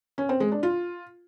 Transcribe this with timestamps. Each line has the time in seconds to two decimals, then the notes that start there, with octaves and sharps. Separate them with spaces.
0.18 C#4
0.29 C4
0.40 G#3
0.52 D4
0.63 F4